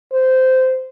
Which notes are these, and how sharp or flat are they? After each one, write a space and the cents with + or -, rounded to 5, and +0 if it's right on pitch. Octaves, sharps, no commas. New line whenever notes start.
C5 -15